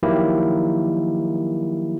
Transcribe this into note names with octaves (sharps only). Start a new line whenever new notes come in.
D#3 F3 F#3 A#3 E4 G4